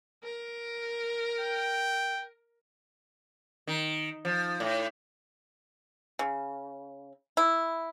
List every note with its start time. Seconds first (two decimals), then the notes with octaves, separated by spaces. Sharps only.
0.24 A#4
1.40 G5
3.67 D#3
4.25 F3
4.60 A2
6.19 C#3
7.37 E4